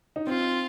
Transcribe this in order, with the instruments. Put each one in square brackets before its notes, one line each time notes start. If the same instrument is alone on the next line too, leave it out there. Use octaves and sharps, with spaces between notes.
[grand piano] D#4
[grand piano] C4 [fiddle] F4